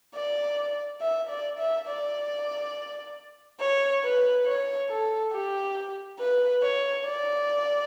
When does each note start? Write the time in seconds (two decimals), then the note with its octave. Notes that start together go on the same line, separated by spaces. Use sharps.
0.15 D5
1.01 E5
1.29 D5
1.59 E5
1.88 D5
3.60 C#5
4.03 B4
4.46 C#5
4.89 A4
5.32 G4
6.19 B4
6.62 C#5
7.05 D5